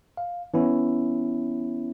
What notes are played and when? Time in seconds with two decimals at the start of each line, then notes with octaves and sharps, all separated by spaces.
0.17 F5
0.54 E3 B3 C#4 E4